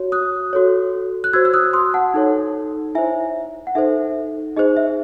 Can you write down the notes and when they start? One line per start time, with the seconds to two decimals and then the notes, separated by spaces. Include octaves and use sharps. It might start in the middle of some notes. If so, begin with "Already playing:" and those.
Already playing: F#4 C#5
0.12 D#6 F#6
0.53 F#4 A4 C#5
1.24 F#6
1.33 F#4 C5 E6 G#6
1.45 E6
1.54 D#6 F#6
1.73 C6 D#6
1.94 F#5 A5
2.14 D#4 A4 C#5
2.95 E4 C5 E5 G#5
3.67 F#5
3.75 D#4 A4 C5 E5
4.56 D#4 G#4 C5 D#5
4.77 E5